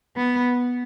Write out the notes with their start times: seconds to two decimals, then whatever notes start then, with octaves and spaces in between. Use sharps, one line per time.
0.16 B3